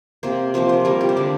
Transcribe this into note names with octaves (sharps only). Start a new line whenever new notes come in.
C3 A#3 C5
C3 F3 A#3 C5
C5
C3 G3 A#3 A#4
G4
C5
D3 G3 A#3 D5